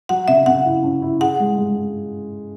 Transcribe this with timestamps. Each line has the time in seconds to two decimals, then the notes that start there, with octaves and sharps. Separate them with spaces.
0.09 F#3 F#5
0.28 C#3 E5
0.46 C#3 F#5
0.65 E4
0.84 C#4
1.02 E4
1.20 G#4 F#5
1.40 G#3
1.58 G#3